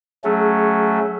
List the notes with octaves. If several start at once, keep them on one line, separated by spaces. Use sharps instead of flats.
F#3 A3 C#4 G#4